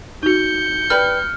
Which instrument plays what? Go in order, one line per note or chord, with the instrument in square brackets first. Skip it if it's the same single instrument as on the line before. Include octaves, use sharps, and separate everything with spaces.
[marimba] D#4 F#4 [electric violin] G6 C#7
[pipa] G3 B4 [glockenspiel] F6